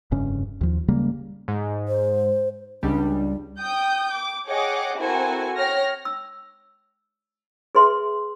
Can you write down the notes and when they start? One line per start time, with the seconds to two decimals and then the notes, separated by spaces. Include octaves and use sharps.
0.12 F1 G2 C#3 C#4
0.61 D#2 F3
0.88 C#3 G3 G#3 A#3
1.48 G#2
1.88 C5
2.83 C#2 G3 D4
3.59 G5 D#6 G6
4.10 D6
4.48 G#4 C#5 D#5 F#5 G5 D6
4.98 C4 E4 F#4 A4 A#4 G#5
5.57 C#5 G5 F6 A#6
6.05 E6
7.75 G#4 B4 E5 C6